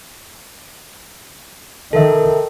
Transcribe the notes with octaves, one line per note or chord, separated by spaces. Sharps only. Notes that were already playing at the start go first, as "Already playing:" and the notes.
D#3 A4 A#4 E5